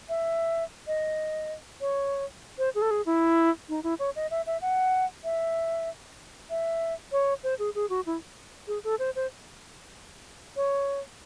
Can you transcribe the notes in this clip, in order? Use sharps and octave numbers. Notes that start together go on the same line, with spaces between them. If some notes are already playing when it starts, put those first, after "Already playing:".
E5
D#5
C#5
C5
G#4
A4
G#4
E4
D#4
E4
C#5
D#5
E5
E5
F#5
E5
E5
C#5
C5
G#4
G#4
F#4
E4
G#4
A4
C5
C5
C#5